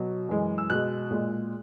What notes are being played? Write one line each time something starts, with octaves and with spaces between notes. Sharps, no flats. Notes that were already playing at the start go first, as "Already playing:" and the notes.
Already playing: B2 F#3
F#2 E3 G#3
E6
B2 G#3 F#6
A#2 G#3